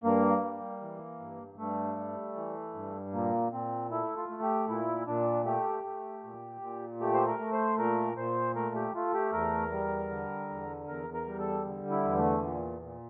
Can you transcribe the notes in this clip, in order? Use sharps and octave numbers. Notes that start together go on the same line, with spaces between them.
G2 A#3
G3
E3
G2
G2 A3
G3
E3
G2
A#2 A#3
A#2 C4
A3 E4
F4
A3
G4
A#2 E4
A#2 D4
A3 G4
A3
A#2
A#2
A3 G4
C5
A#4
A3
C5
A#2 A#4
A#2 C5
A3 A#4
G4
A3 F4
G4
E2 A#4
G3
D3
E2
E2 A#4
A#4
G3
A4
D3
E4
E2
A3
A#2
A#2